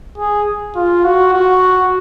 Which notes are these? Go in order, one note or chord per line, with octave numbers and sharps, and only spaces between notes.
G#4
F4
F#4
F#4